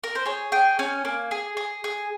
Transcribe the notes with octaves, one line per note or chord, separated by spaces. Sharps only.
A#4
C5
G#4 C#5
G#4 G5
C#4 G#5
A#3
G#4
G#4
G#4